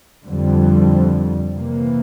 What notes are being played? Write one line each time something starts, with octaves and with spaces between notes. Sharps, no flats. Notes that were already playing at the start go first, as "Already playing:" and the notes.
F2 D3 G3
C3 E3 A#3